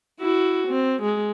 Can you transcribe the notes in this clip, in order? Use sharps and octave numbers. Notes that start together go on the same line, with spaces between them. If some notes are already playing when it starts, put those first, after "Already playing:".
E4 F#4
C4
G#3